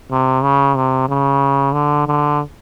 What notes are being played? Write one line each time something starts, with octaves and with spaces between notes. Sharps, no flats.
C3
C#3
C3
C#3
D3
D3